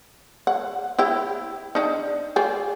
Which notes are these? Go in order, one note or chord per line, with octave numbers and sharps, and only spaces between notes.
F#5
E4 G4 G5
D4 D#4
C5 D5 G#5